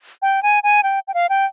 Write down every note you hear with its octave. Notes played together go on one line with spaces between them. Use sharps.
G5
G#5
G#5
G5
G5
F5
G5